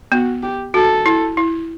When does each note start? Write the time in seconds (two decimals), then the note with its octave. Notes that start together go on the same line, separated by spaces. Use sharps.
0.12 B3 F#4
0.43 G4
0.74 F#4 A4
1.06 E4
1.37 E4